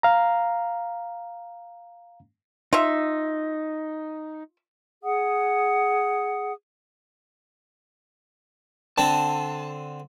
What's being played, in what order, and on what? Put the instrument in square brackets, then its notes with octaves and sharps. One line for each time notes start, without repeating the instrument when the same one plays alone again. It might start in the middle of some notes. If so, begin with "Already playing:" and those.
[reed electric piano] F5 A#5
[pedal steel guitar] D#4 [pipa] F4 E5
[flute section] G#4 F#5 D#6
[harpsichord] D3 C4 [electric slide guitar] A5